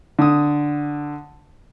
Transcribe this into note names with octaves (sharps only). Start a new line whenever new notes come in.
D3 D#6